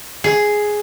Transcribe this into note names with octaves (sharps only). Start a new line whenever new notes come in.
G#4